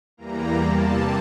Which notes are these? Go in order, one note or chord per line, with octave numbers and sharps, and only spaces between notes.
E2 E3 G3 A#3 A#5
E2 C3 G3 A#3 A5